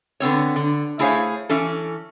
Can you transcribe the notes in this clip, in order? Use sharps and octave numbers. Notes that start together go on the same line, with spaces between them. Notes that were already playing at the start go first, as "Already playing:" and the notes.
D3 B3 C4 C#5
D3
A3 E4 G#4 C5 C#5 F5
E3 C#4 A4